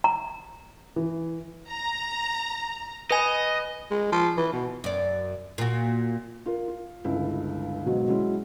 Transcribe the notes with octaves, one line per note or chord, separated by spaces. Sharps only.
A#5
E3
A#5
B4 D#5 G#5
G#3
F3
E3
B2
F#2 D5
A#2 F#4
F4 A#4
F4
G1 C#2 E4
G#2 B2 F#3
F#3 G#3 C#4 E4